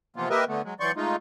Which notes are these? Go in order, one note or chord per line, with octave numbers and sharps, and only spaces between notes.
C3 E3 F3 A#3 B3 F4
A#3 G4 A#4 B4 D#5 E5
D3 A3 B3
F#3 G#3
E3 F#3 D5 C6 C#6 G6
G#3 A3 D#4 F4